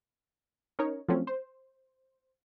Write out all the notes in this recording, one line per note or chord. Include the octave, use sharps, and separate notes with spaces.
C#4 D#4 A#4 C#5
F3 F#3 A3 C4 C#4
C5